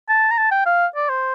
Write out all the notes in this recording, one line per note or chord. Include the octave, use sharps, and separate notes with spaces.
A5
A#5
A5
G5
F5
D5
C5